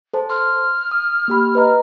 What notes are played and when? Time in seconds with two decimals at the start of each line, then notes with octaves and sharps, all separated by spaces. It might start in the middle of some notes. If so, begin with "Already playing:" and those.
0.13 A4 C5 A5
0.30 C6 F6
0.91 D#6
1.28 A#3 G4 B5
1.55 B4 D#5 A#5